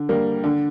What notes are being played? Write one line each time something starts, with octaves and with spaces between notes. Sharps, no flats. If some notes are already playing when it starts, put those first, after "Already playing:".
Already playing: D3
G3 A#3
D3